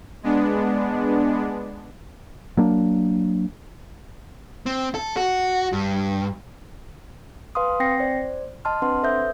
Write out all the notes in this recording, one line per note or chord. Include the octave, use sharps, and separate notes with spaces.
G#3 B3 D4
F#3 A#3 D4
C4
A4
F#4
G2
B4 F5 G#5 C6 D#6
C4 G5 A#6 C7 C#7
C5 D5
D#5 A5 C6 F6
C4 D4 B4 F#5 C6
A4 B4 C5 E5 D#6 G6